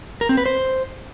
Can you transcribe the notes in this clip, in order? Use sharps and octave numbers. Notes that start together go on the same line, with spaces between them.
A#4
C4
B4
C5